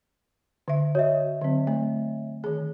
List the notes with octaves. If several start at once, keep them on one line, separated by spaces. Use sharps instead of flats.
D3 E5
F#4 C#5 D#5 E5
D3 F#3 C4
A3
D#3 G#4